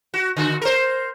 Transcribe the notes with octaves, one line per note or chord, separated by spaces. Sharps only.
F#4
D3 F#4
A#4 C5